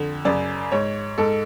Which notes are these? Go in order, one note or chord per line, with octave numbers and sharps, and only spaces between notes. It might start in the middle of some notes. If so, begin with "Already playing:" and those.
Already playing: F2 D3
F#2 C#3 D5
G#2 C#5
G#2 A4